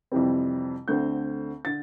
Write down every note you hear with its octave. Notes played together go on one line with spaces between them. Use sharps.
F2 C3 E3 G3 C4
D2 D3 A3 C4 G6
D3 A6